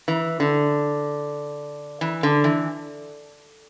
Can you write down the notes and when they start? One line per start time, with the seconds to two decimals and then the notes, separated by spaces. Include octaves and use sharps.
0.08 E3
0.40 D3
2.01 E3
2.23 D3
2.44 E3